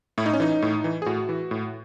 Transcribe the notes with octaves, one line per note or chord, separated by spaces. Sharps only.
A2 E4
D#4
C#4
E3 D#4
A2
E3
G#4
A2 F#4
E3
A2